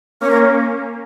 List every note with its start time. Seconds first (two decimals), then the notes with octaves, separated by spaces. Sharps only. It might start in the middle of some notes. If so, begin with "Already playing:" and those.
0.21 A#3 C#4 C#5
0.30 A#4